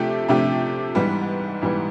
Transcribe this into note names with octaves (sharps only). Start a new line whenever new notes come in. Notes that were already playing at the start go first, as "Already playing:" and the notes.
Already playing: C3 F3 A3 D4 G4
C3 F3 A3 D4 G4
G#2 E3 G3 B3
G#2 E3 G3 B3